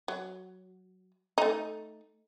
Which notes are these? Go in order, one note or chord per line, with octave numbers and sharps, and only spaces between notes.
F#3
A3 D#4